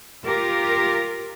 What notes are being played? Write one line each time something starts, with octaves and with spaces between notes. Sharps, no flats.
F4 G4 A#4